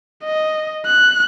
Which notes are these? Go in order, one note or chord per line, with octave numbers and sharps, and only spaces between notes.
D#5
F#6